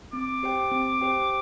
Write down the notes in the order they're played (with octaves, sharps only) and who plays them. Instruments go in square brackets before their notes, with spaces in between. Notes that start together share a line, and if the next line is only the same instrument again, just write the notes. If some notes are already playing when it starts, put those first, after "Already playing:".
[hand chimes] C4 [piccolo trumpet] D6
[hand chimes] G4 C5 G5
C4
G4 C5 G5